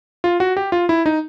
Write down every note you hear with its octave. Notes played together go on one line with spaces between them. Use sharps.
F4
F#4
G4
F4
E4
D#4